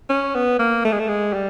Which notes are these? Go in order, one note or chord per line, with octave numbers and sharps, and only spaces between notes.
C#4
B3
A#3
A3
G#3
A3
G#3
G3